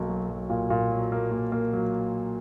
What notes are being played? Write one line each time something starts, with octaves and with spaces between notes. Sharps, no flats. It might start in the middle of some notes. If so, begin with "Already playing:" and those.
Already playing: B1 A#3
F#3
B1
A#2
A#2
F#3
A#3
A#2
A#3
F#3